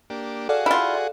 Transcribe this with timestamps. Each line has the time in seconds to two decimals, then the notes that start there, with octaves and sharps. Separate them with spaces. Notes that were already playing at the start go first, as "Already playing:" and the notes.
0.10 A#3 D4 G4
0.49 F#4 G#4 A4 D5 F5 F#5
0.66 E4 F4